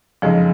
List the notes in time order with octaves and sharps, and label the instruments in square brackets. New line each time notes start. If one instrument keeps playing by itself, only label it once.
[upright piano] F#1 F2 C#3 G#3 D#4 [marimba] F3